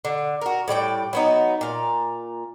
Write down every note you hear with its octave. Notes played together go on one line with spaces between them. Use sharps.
D3
F#4 A#4
A2 G3 D5 G5
F#3 B3 D#4
A#2 F5